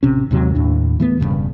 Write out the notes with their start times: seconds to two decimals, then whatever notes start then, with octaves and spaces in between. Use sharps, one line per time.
0.03 A1 C3 C#4
0.31 D#2 G#2 C3 F#3
0.55 D#2 A2 D4
1.00 E3 A3 B3
1.20 E1 E2 G2 C#3